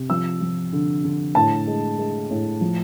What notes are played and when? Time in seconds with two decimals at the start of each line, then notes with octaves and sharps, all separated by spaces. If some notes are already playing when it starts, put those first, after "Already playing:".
Already playing: C3
0.10 F3 E6
0.41 F3
0.73 D3
1.05 D3
1.35 A2 A5
1.67 G#3
1.99 G#3
2.30 A2
2.61 F3